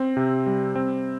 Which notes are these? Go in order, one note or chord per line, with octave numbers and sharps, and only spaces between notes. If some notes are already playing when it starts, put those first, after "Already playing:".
Already playing: C4
C3
G3
C4